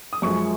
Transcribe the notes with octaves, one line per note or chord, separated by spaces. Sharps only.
D#6
F#2 F3 G#3 C#6